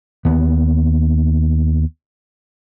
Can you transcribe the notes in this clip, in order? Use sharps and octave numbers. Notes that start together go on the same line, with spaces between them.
D#2 B3